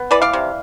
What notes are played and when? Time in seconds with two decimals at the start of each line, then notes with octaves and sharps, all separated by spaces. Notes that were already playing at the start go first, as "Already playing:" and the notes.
Already playing: B3
0.11 E3 B4 D5
0.22 D5 F5
0.33 C3